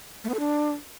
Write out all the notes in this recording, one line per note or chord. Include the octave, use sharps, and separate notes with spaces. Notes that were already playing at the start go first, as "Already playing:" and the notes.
A3
B3
A4
D4